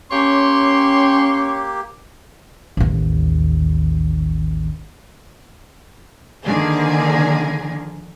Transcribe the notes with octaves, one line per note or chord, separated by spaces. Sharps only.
A#3 C#4 G4 C#5 G5 C6
A1 D#2
D3 D#3 F3 A#3 G#4